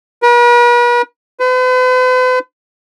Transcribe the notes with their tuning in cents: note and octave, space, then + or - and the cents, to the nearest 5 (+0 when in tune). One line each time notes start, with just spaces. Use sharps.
B4 -45
B4 +45